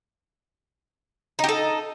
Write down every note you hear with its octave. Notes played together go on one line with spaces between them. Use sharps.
D#4 G4 A4